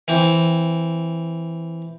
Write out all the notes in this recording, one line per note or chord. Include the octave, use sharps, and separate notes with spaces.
E3 C4